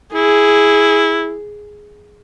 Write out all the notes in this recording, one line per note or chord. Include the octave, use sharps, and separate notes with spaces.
E4 G#4